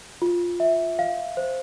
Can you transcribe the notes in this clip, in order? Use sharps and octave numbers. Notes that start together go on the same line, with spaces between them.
F4
E5
F5
C5